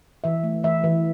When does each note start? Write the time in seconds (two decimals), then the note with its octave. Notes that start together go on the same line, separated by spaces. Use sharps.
0.24 E3 E5
0.44 A3
0.64 E3 E5
0.84 E3